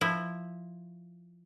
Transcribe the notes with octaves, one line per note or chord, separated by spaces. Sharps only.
F3 E4